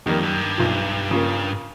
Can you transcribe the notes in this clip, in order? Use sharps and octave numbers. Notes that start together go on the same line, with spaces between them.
F2 D#3 G3 A#3
F#2
G2
B1 A#2 F3
C#3 F3 A#3